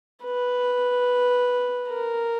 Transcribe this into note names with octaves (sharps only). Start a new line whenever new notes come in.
B4
A#4